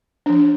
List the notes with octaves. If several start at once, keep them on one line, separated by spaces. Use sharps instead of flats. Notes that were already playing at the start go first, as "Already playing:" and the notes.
F3 D4